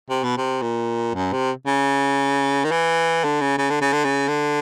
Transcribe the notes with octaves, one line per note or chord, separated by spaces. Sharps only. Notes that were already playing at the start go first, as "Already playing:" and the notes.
C3
B2
C3
A#2
F#2
C3
C#3
D#3
E3
D3
C#3
C#3
D3
C#3
D3
C#3
D3